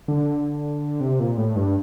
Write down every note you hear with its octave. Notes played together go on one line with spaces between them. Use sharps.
D3
C3
A#2
A2
G2